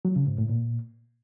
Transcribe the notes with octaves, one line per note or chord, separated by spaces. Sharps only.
F#3
C#3
G#2
A2
A#2